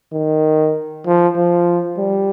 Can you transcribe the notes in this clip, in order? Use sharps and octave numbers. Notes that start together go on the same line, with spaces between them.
D#3
F3
F3
G3